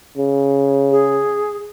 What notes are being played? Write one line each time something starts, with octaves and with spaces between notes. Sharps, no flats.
C#3
G#4